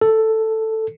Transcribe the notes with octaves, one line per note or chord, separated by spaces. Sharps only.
A4